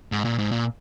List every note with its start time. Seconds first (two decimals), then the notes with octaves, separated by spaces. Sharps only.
0.12 G#2
0.25 A#2
0.38 G#2
0.52 A#2